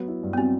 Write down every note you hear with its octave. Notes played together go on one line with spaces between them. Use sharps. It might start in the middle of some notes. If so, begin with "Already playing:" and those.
Already playing: F#3 B3
E4
G2
B3
F#3 C4